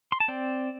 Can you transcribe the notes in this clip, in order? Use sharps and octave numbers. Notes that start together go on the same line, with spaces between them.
C6
A5
C4 D5 G5